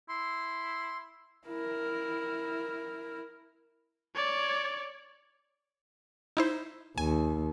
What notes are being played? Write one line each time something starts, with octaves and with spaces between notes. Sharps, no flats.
E4 C6
E4 A#4
C#5 D5
D#4 E4 C5
D#2 G#5